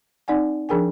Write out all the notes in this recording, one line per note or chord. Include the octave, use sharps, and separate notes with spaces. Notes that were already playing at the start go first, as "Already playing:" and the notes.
C4 D#4 D5 F#5 G#5
F3 D4 G#4 A#4 G5 G#5